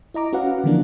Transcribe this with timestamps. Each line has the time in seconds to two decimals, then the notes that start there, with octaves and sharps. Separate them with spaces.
0.14 E4 D#5 A#5 D6
0.33 C#4 F#4 B4 F5 F#5
0.64 D3 E3 F3 A#3 D4